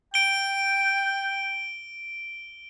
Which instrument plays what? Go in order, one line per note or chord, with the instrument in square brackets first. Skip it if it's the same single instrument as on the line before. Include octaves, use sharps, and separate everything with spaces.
[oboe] G5 [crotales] D7 G7